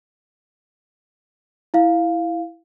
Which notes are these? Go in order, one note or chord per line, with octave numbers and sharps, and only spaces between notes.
E4 F5